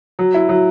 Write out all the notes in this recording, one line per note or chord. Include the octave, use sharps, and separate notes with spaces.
F#3
E4
F#3